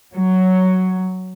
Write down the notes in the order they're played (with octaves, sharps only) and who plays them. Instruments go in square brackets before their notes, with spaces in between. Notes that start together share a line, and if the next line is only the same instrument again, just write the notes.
[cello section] F#3